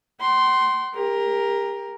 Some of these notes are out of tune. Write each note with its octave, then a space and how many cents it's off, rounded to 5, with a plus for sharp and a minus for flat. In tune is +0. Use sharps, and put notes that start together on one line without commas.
F#5 +45 C6 +0
G4 +35 A#4 +5